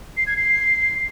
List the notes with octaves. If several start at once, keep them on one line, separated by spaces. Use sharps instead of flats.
C7
G#6
C7